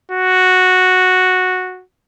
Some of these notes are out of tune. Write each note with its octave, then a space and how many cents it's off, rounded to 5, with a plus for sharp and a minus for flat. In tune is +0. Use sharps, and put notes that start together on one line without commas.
F#4 -5